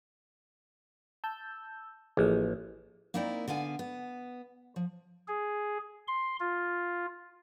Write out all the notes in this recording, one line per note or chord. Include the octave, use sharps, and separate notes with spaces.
A5 E6 G6
A1 F3 A#3 G#4 D#5
A#3 C4 D#4 E4 A#4 D5
D3 B3 F5 G#5
B3
F3
G#4
C6
F4